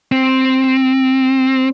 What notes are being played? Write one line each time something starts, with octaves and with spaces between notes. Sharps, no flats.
C4